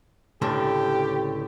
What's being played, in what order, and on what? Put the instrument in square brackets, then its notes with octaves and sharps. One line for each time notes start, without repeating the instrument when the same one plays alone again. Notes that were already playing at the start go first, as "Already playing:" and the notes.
[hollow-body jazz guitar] C#2 A2 D3 [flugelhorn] G4